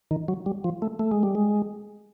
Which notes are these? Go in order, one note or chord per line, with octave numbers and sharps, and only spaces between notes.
D#3
F#3
G3
F3
A3
A3
G#3
G3
G#3